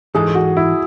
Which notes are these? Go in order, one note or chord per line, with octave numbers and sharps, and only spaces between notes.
G#2 E3 G#3 D#4 G#4 A4
F#4
E4